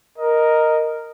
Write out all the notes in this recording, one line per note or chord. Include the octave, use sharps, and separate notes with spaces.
A#4 D#5